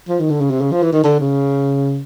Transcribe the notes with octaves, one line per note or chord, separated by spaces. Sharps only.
F3
D#3
D3
C#3
C3
C#3
F3
E3
D#3
D3
C#3